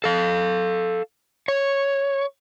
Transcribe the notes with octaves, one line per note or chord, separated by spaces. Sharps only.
A4 F5
C#5